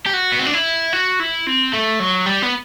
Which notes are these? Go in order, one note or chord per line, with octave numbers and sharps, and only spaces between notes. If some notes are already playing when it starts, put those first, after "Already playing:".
G4
F#4
B3
C4
D4
E4
F#4
E4
C4
A3
F#3
G3
B3